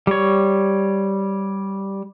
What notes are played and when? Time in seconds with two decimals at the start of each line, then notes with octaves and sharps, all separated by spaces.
0.07 G3 C#5